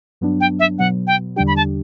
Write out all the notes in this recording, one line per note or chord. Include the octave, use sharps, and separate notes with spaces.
G2 F#3 B3 D4
G5
E5
B2 F#3 B3 F#5
G5
E2 D3 G3 D4 G4 G5
B5
A5